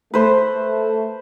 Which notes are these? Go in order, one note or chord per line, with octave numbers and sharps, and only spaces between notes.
A3 B4 C5